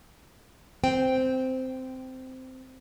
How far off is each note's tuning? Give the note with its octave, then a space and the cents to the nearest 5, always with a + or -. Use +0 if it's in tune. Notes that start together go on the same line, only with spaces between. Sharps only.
C4 -10 G5 +0